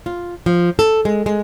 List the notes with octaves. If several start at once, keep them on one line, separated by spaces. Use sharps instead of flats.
F4
F3
A4
G#3
G#3